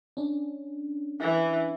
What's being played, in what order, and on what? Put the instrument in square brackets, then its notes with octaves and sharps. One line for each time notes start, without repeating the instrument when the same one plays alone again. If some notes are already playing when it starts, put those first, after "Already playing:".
[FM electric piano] C#4 D4
[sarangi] E3